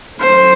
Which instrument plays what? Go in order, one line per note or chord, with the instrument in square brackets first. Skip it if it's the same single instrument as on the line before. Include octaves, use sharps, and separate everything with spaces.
[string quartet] F#3 A3 C#4 [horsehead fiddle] C5